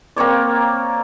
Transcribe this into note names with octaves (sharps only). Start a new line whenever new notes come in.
A#3 C4 C#5 D5